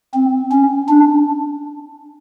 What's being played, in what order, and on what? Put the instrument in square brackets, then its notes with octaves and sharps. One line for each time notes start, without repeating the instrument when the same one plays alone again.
[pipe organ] C4
C#4
D4